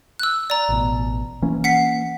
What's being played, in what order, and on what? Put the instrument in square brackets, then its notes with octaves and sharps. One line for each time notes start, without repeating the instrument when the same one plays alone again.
[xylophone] E6 F#6
D5 A#5
[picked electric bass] A1 B2
E3 A#3 C#4
[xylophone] F#5 B6 C7